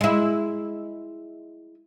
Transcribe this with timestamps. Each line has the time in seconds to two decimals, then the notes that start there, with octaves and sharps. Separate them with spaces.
0.01 G#3 E4